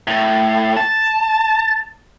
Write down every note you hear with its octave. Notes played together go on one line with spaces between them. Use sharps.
A2
A5